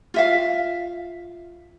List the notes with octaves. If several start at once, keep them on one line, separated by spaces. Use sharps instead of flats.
F4 E5 F5